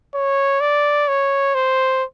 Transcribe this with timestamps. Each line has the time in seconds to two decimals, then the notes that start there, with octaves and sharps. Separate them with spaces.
0.14 C#5
0.61 D5
1.08 C#5
1.55 C5